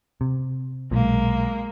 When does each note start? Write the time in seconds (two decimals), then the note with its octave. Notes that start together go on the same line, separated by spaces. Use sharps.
0.21 C3
0.91 B1 A#2 G#3 A#3